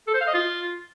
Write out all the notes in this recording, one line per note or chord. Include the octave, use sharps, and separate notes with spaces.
A4
C5
F5
D#5
F4